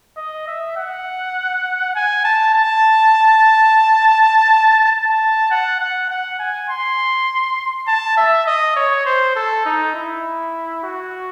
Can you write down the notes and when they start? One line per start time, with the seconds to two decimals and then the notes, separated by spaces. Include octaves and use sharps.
0.17 D#5
0.48 E5
0.77 F#5
1.95 G#5
2.24 A5
2.54 A5
4.92 A5
5.51 F#5
5.80 F#5
6.10 F#5
6.39 G#5
6.69 C6
7.88 A5
8.17 E5
8.47 D#5
8.76 C#5
9.06 C5
9.36 A4
9.66 D#4
9.95 E4
10.84 F#4